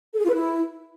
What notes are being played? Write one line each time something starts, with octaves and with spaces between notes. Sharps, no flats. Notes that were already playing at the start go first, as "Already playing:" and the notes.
A4
G#4
F4
B4
E4